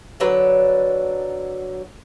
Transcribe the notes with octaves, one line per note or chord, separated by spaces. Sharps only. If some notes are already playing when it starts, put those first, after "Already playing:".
D3 F#3 B4